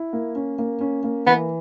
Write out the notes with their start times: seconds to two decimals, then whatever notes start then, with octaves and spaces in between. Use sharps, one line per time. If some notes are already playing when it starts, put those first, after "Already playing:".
Already playing: E4
0.13 A#3
0.35 C#4
0.58 A#3
0.81 C#4
1.04 A#3
1.26 E3 B3